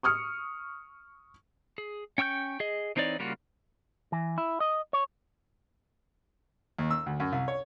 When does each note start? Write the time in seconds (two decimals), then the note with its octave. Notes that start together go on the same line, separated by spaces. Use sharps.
0.03 C#6 D#6 F6 C#7
1.78 G#4
2.18 C#4 G5 C#6 E6 G6
2.60 G#4 D#5
2.96 E3 C4 D#4 C#5 D5
3.19 C#3 G3 A#3 F4 F#4
4.12 E3
4.38 E4
4.60 D#5
4.93 C#5
6.79 D#2
6.91 E6
7.06 D2
7.20 F#2
7.32 C2
7.48 C#5